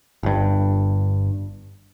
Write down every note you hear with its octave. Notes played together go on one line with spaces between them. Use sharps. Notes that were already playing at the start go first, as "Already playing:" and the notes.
G1 G2